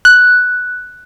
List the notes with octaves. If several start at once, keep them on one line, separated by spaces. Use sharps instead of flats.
F#6